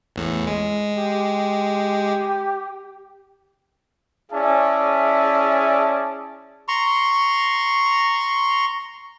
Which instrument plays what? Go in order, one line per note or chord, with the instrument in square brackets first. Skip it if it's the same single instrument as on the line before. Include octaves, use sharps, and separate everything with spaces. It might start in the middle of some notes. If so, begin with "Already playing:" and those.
[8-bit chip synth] A1 E2 A2
G#3
[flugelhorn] G4
[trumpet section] C#4 E4 G#4 D5 E5 A5
[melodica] A#5 C6 C#6